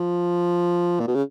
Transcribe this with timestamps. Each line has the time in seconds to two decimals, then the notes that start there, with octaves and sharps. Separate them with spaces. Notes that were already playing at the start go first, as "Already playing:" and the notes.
Already playing: F3
1.00 A#2
1.07 B2
1.15 C#3